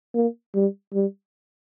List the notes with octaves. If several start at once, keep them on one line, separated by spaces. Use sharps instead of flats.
A#3
G3
G3